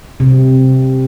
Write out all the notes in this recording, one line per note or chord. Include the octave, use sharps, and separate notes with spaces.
C3